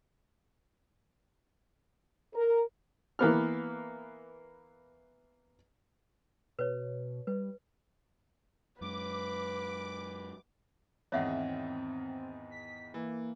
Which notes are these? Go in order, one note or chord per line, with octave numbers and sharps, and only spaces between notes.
A#4
E3 A#3 B3 F6
B2 B4 C#5
G3 B4
F#2 G#3 B4 D6
E2 G#2 D#3 C4 C#5 E5 F#5
B6
E3 A#3